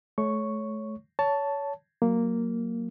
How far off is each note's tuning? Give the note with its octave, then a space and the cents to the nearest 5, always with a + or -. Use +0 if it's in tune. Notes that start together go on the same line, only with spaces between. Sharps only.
A3 -35 C#5 +0 C#6 +0
C#5 +20 A5 +0
F#3 +0 A#3 -5